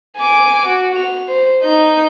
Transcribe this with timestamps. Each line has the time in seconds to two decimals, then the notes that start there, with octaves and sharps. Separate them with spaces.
0.17 G#5 D6
0.66 F#4
0.96 F7
1.28 C5
1.63 D#4 G6